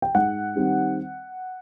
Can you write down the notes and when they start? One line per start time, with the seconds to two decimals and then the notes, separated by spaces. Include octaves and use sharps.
0.02 G5
0.14 G#2 F#5
0.56 D#3 G3 C4